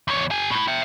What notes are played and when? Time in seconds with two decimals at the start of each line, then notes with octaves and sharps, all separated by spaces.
0.08 E2 C#5
0.31 G4 G#5
0.50 A2 E4
0.68 E5 G5